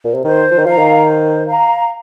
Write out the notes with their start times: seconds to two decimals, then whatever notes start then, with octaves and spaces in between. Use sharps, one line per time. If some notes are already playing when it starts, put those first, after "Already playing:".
0.04 A#2
0.14 C3
0.24 D#3 C5
0.51 F3
0.58 D#3
0.65 F3 F5 A#5
0.78 D#3
1.06 C5
1.47 F5 A#5